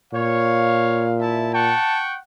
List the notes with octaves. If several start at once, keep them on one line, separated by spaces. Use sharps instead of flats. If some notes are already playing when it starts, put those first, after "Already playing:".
A#2 C#5 F5
E4 E5 A5
F#5 G5 A5 C#6